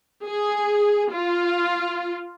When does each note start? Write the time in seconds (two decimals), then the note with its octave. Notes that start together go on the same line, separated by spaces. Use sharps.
0.26 G#4
1.13 F4